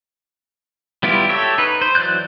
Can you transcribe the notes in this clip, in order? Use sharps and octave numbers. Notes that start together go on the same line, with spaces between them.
G3 B3 E4 F4 G4
G4 A4 C#5 E5
D#4 B4
C5
E3 F#3 D5 F#6 G6